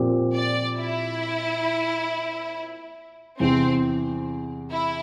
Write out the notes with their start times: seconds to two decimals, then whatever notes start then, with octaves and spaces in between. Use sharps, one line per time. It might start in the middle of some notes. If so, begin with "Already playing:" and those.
Already playing: A#2 F3 C4 G4
0.35 D5
0.78 E4
3.40 E2 C3 E3 C4
4.71 E4